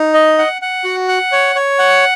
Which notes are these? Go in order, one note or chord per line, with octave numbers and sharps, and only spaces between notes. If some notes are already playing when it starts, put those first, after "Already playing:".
Already playing: D#4
D#5
F#5
F#5
F#4
F#5
C#5
C#5
F#5